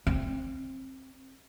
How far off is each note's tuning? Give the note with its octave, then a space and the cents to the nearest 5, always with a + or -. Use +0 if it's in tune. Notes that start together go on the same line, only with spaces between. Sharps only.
C4 +20